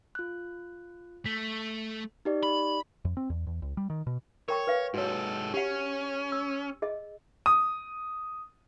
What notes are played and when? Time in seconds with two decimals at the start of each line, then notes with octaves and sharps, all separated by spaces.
0.15 F4 F#6
1.26 A3 B6
2.25 D#4 G4 D5
2.44 B5
3.05 F2
3.17 C4
3.30 E2
3.47 E2
3.62 C#2
3.77 G3
3.90 D#3
4.07 B2
4.48 A#4 C#5 G5 C#6
4.67 B4 F5
4.94 G#2 F#4 A4 C#5
5.54 C#4 G4 F#5
6.32 E6
6.82 G#4 D#5
7.46 D#6